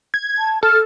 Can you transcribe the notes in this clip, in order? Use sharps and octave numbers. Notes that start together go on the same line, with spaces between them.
G#6
A5
A4 F6